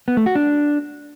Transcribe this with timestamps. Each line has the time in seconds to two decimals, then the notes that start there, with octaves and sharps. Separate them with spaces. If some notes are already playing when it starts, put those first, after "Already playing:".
0.08 B3
0.17 A3
0.26 F#4
0.35 D4